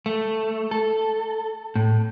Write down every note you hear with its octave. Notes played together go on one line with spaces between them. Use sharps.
A3
A4
A2